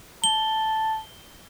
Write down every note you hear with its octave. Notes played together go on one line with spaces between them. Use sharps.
A5 G7